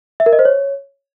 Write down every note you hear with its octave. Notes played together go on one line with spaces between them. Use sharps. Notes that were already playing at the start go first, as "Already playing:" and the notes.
E5
A#4
D#5
C5
C#5